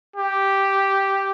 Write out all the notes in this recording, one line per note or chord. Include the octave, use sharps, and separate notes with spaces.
G4